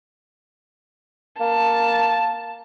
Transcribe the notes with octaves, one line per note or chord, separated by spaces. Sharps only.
A#3 A5